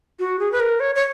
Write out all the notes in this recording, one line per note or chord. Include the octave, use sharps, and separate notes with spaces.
F#4
G#4
B4
A#4
C#5
C#5